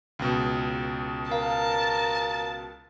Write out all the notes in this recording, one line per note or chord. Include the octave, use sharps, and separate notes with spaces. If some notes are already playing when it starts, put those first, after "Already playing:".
C#2 B2
A#4 F5 A5